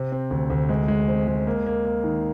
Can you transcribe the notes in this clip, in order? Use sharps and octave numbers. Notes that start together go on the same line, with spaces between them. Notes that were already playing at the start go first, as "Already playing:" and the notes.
Already playing: C3
C4
D2
D2
G#3
G#3
C4
G#3
A#3
A#3
A#3
D#3